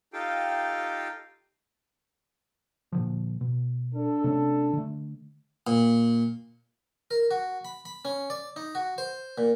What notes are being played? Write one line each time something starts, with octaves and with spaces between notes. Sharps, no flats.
D#4 F4 G4 A4 F5 G5
A#2 D3 F3
B2
D4 A4
C3 A3 C#4
D3 A3
A#2
A#4
F#4
B5
B5
C#4
D5
D#4
F#4
C5
A#2